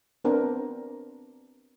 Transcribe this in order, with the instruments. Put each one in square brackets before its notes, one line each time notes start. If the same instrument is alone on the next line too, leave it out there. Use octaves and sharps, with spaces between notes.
[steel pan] B3 C4 D4 A#4 C5